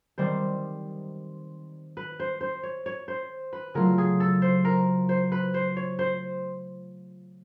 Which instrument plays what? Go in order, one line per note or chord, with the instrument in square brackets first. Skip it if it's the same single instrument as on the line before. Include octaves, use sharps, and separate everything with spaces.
[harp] D#3 G3 C4 [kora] C5
[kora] B4
C5
C5
C#5
C#5
C5
B4
[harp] C#3 F#3 A3 C#4 F4 [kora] A#4
[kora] G#4
A4
C5
A#4
C5
B4
C5
C#5
C5